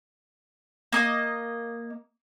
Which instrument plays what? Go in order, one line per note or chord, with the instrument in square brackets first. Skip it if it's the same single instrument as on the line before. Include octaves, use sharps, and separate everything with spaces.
[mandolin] A#3 D#5